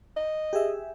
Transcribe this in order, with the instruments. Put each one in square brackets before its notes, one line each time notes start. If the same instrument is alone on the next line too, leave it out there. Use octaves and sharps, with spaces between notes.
[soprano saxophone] D#5
[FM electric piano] G4 G#4 E5